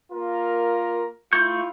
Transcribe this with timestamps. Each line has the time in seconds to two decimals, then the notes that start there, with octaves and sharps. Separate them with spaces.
0.12 A#3 F4 A#4
1.33 A3 E4 F4 F5 C#6 G6